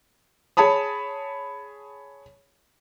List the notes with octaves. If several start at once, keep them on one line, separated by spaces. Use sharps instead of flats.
G#4 C#5 A5 B5 D#6